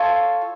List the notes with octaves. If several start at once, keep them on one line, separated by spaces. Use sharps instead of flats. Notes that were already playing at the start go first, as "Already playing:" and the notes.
Already playing: F4 A4 C#5